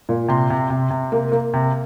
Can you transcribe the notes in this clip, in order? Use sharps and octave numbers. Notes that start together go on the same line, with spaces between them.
A#2
C3 C6
C3
C3
C3
A#3
A#3
C3